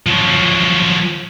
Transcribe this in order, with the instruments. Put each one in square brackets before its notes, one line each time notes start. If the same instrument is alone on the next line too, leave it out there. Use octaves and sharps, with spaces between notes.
[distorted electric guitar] F3 F#3